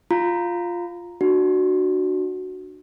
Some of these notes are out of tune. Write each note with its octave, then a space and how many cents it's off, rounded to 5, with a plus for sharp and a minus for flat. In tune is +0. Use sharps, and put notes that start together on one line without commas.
F4 +0 A#5 +0
D4 +25 F#4 +0